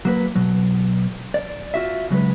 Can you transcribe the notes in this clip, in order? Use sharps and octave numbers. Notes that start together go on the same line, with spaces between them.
F#3 A#3 B4
B2 F#3
D5
F4 F#4 E5
C#3 F#3 G#3 B4